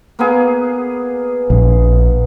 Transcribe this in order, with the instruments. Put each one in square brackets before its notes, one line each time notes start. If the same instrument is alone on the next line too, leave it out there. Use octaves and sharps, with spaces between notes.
[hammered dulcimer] A#3 B3 G#4
[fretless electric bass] A#1